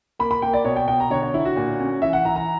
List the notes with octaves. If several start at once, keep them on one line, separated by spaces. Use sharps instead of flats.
A#3 B5
B5
A#3 G5
D5
B2 C#5
G5
B2 G5
A#5
D3 C#5
C#5
D3 E4
F#4
A#2
C#4
E3 E5
F#5
E3 A#5
A#5